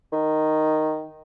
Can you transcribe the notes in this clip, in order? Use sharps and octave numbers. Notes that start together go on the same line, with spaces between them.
D#3